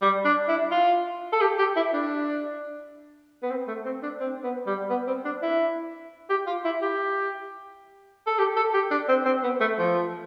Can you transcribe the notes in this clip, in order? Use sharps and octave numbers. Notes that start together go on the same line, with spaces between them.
G3
D4
E4
F4
A4
G4
G4
E4
D4
B3
C4
A3
C4
D4
C4
B3
G3
B3
C4
D4
E4
G4
F4
E4
G4
A4
G4
A4
G4
D4
C4
C4
B3
A3
F3